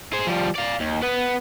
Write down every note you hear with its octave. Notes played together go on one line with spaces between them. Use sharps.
G#4 C5
F3 G3
D5 F5
D#2
B3 B4